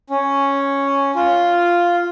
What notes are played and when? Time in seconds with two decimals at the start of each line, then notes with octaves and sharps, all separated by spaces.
0.10 C#4
1.15 F4